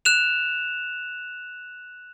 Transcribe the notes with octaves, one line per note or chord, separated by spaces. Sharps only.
F#6 E7 F7